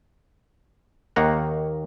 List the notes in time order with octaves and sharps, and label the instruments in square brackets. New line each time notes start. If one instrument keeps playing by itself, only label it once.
[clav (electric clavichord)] D#2 D#3 A#3 F#5 A#5